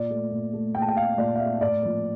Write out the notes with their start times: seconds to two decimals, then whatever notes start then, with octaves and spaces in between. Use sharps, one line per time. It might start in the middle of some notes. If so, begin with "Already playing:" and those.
Already playing: A#2 D5
0.10 A3
0.32 A#2
0.53 A3
0.75 A#2 G5
0.82 A5
0.89 G5
0.96 A3 F5
1.18 A#2 D5
1.35 F5
1.39 A3 E5
1.61 A2 D5
1.82 F3 A#3